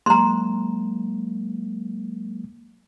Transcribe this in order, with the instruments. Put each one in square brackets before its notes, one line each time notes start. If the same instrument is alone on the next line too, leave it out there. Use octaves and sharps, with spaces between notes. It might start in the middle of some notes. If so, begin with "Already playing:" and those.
[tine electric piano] F#3 G#3 A#3 [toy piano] A#5 C6